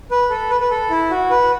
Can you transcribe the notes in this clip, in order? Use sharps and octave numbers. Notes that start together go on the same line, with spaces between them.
B4
A4
B4
B4
A4
E4
F#4
B4